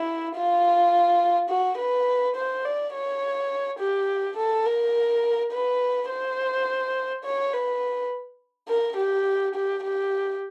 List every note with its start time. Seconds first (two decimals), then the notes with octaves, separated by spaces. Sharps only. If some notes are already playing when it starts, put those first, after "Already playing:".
Already playing: E4
0.35 F4
1.49 F#4
1.77 B4
2.35 C5
2.65 D5
2.93 C#5
3.79 G4
4.37 A4
4.65 A#4
5.52 B4
6.09 C5
7.24 C#5
7.53 B4
8.68 A#4
8.97 G4
9.55 G4
9.83 G4